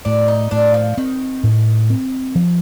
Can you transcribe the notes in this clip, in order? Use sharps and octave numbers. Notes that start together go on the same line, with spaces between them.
A2 D4
D#4
A2 D4
F3
D#3 C4
A2
C4
F3